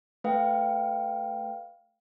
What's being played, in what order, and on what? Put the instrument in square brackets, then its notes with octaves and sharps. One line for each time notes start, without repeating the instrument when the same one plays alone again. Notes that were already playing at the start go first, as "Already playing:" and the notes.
[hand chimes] A3 B4 F5 G5